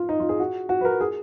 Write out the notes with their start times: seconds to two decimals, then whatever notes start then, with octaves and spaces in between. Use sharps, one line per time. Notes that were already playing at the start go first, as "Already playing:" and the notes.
Already playing: F4
0.09 D#4
0.20 F4
0.29 G#4
0.40 F#4
0.69 F#4
0.81 B4
0.85 A#4
1.01 G#4